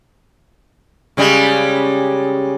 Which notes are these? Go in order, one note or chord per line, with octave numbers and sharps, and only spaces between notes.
C#3 G3 G#3